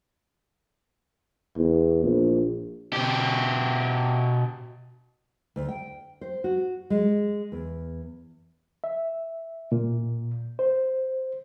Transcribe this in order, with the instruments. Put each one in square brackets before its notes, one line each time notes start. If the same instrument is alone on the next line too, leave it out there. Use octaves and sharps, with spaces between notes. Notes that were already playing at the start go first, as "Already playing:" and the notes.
[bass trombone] E2
A#1
[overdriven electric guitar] B2 G4
[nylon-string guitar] D2
G5
C5
F#4
G#3
E2
[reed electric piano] E5
A#2
C5